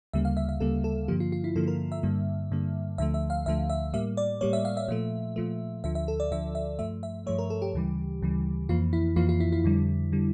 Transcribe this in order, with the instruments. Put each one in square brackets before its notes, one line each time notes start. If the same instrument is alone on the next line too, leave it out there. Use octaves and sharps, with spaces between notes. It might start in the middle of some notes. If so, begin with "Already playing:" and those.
[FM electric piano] D2 C#3 G3 A#3 E5
F5
E5
E5
D2 C#3 G3 A#3 A4
A4
G2 D3 F3 A#3 G4
F4
F4
E4
G2 D3 F3 A#3 A4
A#4
E5
G2 D3 G3 A#3
G2 D3 G3 A#3
D2 D3 F3 A3 E5
E5
F5
D2 D3 F3 A3 E5
E5
A2 G3 A#3 E5
D5
A2 G3 A#3 C#5
E5
F5
E5
A#2 F3 A3
A#2 F3 A3
D2 D3 F3 E5
E5
A4
D5
D2 D3 F3 E5
E5
G2 F3 A3 E5
E5
G2 F3 A3 C#5
A#4
A4
G4
D2 C#3 E3 G3
D2 C#3 E3 G3
F2 E3 A#3 F4
E4
F2 E3 A#3 F4
F4
E4
E4
F2 D3 G3
D3 G3